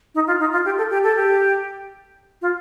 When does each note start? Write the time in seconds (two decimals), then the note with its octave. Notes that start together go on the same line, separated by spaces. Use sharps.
0.15 D#4
0.27 F4
0.40 D#4
0.52 F4
0.65 G4
0.78 A4
0.90 G4
1.03 A4
1.15 G4
2.42 F4